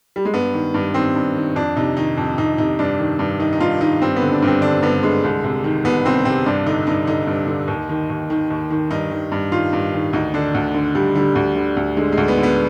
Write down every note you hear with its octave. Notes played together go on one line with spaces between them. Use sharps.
G3
G#3
G2 B3
D#3
G2
D#3 C4
G2
D#3
F2 D4
C3 D#4
D#3 D#4
F2
F2 D#4
C3 D#4
G2 D4
D#3
G2
D#3 D#4
D#4
G2 F4
D#3 D#4
G2 C4
B3
D3
D4
G2 C4
D3 D4
G2 B3
D3 G#3
C2
C3
D#3
C2 B3
C2 C4
C3 C4
G2 D4
D3 D#4
G2 D#4
D3 D#4
G2
D3
D#2
D#3
D#2
D#3
D#2
D#3
G2 D#4
D#3
G2
D#3 F4
G2
D#3
D2 D#4
D3 D4
D2
D3
D2 G3
D3 G3
D2
D3
D2
D3 G#3
G#3
D2
B3
D3
B3